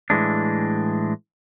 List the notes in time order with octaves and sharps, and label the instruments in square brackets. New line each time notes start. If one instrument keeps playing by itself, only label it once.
[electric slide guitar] A2 E3 G#3 D4